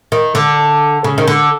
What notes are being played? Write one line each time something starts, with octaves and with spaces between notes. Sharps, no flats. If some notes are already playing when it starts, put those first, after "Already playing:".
D#3
D3
C#3
D#3
D3